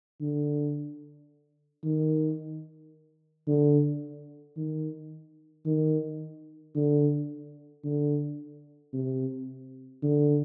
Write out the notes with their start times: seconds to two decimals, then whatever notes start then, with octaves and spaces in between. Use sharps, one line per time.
0.21 D3
1.84 D#3
3.47 D3
4.57 D#3
5.66 D#3
6.75 D3
7.84 D3
8.93 C3
10.03 D3